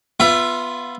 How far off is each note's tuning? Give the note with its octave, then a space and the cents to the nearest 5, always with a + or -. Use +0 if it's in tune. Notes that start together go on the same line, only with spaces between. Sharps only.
B3 +0 F4 +0 E5 +25